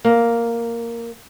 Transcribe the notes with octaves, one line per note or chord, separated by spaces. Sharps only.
A#3